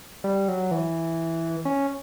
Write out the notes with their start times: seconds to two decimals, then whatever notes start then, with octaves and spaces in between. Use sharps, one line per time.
0.24 G3
0.48 F#3
0.71 E3
1.65 C#4